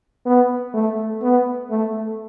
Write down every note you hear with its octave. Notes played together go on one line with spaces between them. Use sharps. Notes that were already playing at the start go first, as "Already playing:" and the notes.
B3
A3
B3
A3